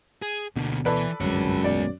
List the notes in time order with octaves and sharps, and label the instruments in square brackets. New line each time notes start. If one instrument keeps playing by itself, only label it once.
[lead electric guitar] G#4
[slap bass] D2 B2 B3 [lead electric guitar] D3 A#3
[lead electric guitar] E3 [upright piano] A4 B4 D5
[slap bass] G1 C2 [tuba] F#2 [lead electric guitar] G#3 C#5
[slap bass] D#1 B1 B3 [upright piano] D5